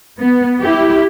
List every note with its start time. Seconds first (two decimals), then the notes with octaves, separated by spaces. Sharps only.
0.20 B3
0.60 E4 G4